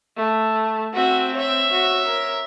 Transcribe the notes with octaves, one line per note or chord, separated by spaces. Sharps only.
A3
C4 F#4 E5
C#5 E5
F#4
A#4